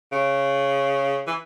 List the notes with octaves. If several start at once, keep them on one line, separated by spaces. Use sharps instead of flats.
C#3
E3